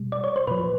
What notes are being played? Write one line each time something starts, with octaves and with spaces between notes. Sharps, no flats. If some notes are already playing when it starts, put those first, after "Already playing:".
Already playing: B2 G3
D5
C#5
C5
A#2 F3 B4